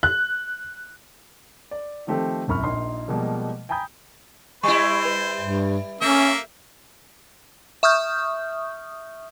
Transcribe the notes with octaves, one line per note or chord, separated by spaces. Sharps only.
F#6
D5
D#3 F3 A3 C4 G4
D1 C2 F#2 B5 C#6 F6
A#1 A#2 D#4 C6
B2 F3 G3 G#3 A#3
G5 G#5 A#5 B5 D#6 G6
G3 E4 C5 C#6
B4
G2
A3 A#3 C#4 E5
E5 C#6 D#6 F6 G6